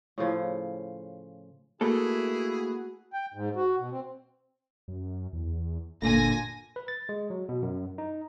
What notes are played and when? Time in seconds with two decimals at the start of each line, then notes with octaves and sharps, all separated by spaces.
0.18 A2 C#3 F3
1.81 A3 A#3 E4 F#4 G#4 A4
3.13 G5
3.34 G#2
3.56 F#4
3.78 B2
3.91 C4
4.88 F#2
5.33 E2
6.02 F#1 A#2 D3 A#3 G#5 A#6
6.76 B4
6.88 A6
7.09 G#3
7.30 F#3
7.49 B2
7.62 F#2
7.98 D#4